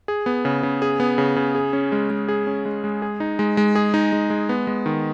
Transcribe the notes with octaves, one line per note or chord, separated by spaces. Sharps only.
G#4
B3
C#3
C#3
G#4
B3
C#3
C#3
G#4
C#4
G#3
G#3
G#4
C#4
G#3
G#3
G#4
D#4
G#3
G#3
G#4
D#4
G#3
G#3
B3
G#3
D#3